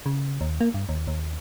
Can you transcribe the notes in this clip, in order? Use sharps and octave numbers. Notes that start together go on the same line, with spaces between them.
C#3
D#2
A#3
G2
D#2
D#2